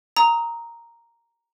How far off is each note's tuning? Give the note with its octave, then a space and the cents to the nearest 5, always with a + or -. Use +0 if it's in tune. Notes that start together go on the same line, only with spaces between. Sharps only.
A#5 +0 D#6 +25